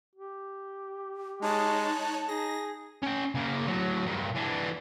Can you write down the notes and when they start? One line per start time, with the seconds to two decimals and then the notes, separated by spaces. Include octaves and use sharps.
0.15 G4
1.42 G#3 D#4 C#5 A5 F#6
2.28 D#4 G#4 A#6
3.03 C#4 G5
3.35 C#3 A#3
3.67 A2 F#3
4.06 G2 A#2
4.36 E3 D4